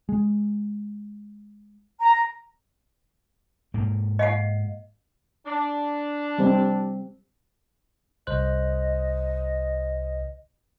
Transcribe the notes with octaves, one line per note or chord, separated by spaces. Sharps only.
G#3
A#5
G#2 A#3
D#5 F5 F#5
D4
G3 C4
C2 C5 D#5 F#6